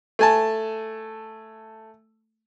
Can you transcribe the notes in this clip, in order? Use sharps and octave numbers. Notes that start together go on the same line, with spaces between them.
A3 G#5 A5